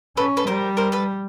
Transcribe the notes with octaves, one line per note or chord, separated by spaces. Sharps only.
C#4 A4 B4
A4 B4
G3 A#4 C5
A#4 C5
A4 B4